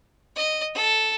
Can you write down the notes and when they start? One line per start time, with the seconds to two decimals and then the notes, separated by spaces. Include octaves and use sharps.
0.36 D#5
0.74 A4